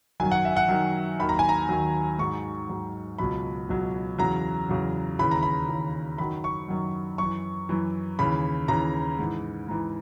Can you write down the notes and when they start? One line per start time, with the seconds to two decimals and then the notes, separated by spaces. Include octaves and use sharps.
0.20 F#2 D#3 F#3 G#5
0.32 F#5
0.45 E5
0.57 F#5
0.69 F#2 D#3 F#3
1.19 D#2 D#3 F#3 B5
1.29 A#5
1.39 G#5
1.49 A#5
1.69 D#2 D#3 F#3
2.19 G#2 F#3 C#6
2.69 G#2 F#3
3.18 C#2 B2 F#3 B5
3.69 C#2 B2 F#3
4.18 E2 C#3 F#3 A#5
4.69 E2 C#3 F#3
5.19 D#2 C#3 E3 B5
5.31 A#5
5.43 B5
5.69 D#2 C#3 E3
6.18 F#2 D#3 F#3 B5
6.44 C#6
6.68 F#2 D#3 F#3
7.18 F#2 E3 C#6
7.69 F#2 E3
8.19 D#2 C#3 E3 B5
8.68 D#2 C#3 E3 A#5
9.19 G#2 E3
9.68 G#2 E3